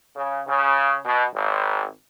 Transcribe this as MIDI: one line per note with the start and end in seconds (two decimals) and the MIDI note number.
0.16 0.40 49
0.47 0.97 49
1.05 1.25 47
1.34 1.84 32